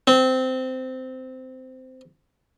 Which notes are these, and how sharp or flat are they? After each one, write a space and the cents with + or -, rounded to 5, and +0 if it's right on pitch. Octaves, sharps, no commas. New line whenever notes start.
C4 -15